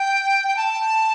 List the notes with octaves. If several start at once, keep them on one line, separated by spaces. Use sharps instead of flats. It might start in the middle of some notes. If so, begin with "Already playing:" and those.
Already playing: G5
G5
A5